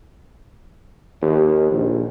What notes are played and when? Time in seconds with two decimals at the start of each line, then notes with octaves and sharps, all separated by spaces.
1.22 D#2
1.72 A#1